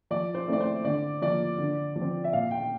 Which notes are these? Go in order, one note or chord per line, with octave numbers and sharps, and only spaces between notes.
F3 D5
C5
A3 C4 E4 D5
C5
D3 D5
F3 A#3 D5
D3
F3
C4
E5
A#2 F5
G5